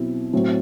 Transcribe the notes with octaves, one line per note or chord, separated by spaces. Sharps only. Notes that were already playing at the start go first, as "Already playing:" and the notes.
Already playing: B2 F#3 C4 E4
A2 F#3 C4